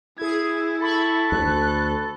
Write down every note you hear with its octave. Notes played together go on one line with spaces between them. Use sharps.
E4 G#4 G#6
A4 A5 B5 C#6
D2 F#6